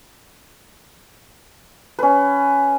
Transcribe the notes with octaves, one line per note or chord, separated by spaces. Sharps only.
C#4 B4